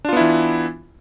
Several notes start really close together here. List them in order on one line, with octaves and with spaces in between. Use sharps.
D4 F4 B3 E4 E3